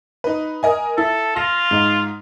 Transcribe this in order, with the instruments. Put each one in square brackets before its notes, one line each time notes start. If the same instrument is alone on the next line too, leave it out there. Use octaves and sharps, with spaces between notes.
[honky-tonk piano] D#4 B4
A#4 D#5 G#5
[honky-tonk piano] E4 [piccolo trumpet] A4
[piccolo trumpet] F4 [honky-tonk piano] A#6
[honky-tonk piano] G#2 D#4